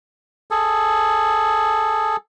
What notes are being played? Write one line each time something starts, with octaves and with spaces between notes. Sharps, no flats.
G#4 A4